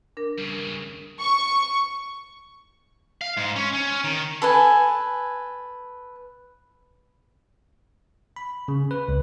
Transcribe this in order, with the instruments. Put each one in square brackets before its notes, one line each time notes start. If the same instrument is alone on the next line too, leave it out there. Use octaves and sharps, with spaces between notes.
[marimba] D4 A#4
[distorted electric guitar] G2 C#3
[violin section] C#6
[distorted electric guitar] F5
G#2
C#4
C#4
D#3
[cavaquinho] A4 B4 G#5
[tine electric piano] B5
C#3
B4
C#2